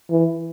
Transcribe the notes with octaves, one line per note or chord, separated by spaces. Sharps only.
E3